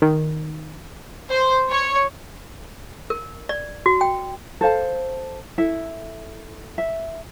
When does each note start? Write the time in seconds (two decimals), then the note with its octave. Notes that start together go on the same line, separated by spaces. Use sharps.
0.02 D#3
1.29 C5
1.69 C#5
3.10 A#4
3.49 D5
3.86 F#4
4.01 G5
4.61 A4 C5 F5 A5
5.58 E4 A4 E5
6.78 E5